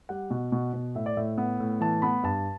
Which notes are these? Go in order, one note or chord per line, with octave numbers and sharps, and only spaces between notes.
G3 F#5
B2 F#5
B2
B2
A2 E5
D5
A2 E5
B3
A2
E3 A5
B3 B5
G2 A5